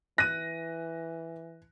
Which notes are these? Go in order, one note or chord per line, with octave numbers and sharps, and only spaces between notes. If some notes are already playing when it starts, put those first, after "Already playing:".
E3 F#6 A#6 D#7